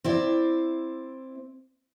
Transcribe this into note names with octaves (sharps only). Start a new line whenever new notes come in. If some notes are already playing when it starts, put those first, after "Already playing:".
C4 E4 D5